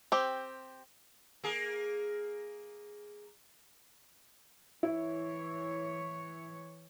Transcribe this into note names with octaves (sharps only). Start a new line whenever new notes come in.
C4 G4
A#3 G#4
E3 E4 C#5